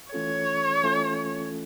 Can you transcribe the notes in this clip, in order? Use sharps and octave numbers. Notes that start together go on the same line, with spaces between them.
E3 A3 C#4 F4 A4 C#5
E3 A3 C#4 F4 A4